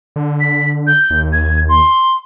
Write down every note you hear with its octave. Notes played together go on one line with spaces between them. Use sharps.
D3
B6
G6
D#2
G#6
C6